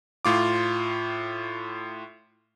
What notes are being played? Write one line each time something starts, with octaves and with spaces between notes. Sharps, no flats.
A2 F4 D6